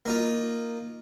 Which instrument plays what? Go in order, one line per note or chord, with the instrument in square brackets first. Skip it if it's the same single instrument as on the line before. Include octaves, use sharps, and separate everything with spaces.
[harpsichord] A#3 D#4 F4